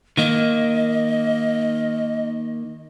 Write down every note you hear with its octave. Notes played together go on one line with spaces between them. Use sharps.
D#3 A#3 D#5